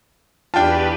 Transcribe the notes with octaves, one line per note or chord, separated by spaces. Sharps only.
E2 D4 F4 G4 B4 G5 A5